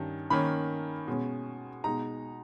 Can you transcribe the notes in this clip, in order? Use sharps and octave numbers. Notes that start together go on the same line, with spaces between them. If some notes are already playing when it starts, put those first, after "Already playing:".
Already playing: G2 D#3 C#4
D#3 A#3 C#4 B5
B2 G#3 C#4
B2 G#3 D#4 A#5